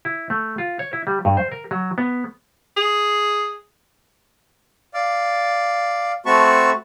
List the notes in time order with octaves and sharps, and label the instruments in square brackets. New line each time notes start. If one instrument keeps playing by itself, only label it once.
[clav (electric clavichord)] E4
A3
F4
C#5
E4
G3
G2
C5
A#4
F#3
B3
[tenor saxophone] G#4
[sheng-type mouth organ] D5 F5
A3 C4 F#4 A5 B5 C#6